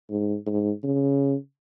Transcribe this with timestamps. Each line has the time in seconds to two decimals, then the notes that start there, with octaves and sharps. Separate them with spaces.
0.10 G#2
0.46 G#2
0.84 C#3